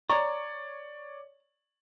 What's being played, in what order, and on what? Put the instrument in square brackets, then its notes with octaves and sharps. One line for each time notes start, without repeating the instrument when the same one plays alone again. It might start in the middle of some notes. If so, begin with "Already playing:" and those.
[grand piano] C#5 D5 [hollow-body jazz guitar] A#5 [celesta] C#6